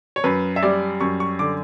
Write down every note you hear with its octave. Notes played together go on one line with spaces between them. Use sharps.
C#5
F#2 B4
E5
G3 D5
F#2 C#6
C#6
D3 D6